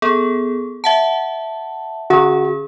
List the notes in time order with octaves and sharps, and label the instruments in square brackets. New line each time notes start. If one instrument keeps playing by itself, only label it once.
[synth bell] B3 G#4 A4
E5 F#5 A5
[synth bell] D3 C#4 G#4 [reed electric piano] F#4